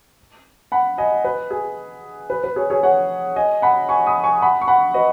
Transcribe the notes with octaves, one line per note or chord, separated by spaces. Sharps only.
F#5 B5
D#5 G#5
B4
G#4
B4
B4
G#4 C#5
G#4 C#5
C#5 F#5
D#5 G#5
F#5 B5
G#5 C#6
B5 D#6
G#5 C#6
F#5 B5
C#6
F#5 B5
B4 D#5